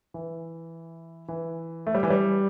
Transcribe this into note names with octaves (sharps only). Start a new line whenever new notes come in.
E3
E3
A3
G3
E3
G3